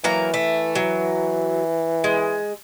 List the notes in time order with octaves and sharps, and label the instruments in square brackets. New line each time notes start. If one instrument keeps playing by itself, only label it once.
[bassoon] E3 [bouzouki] F#3 A#3 A#5
[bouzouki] A3
F#3
G#3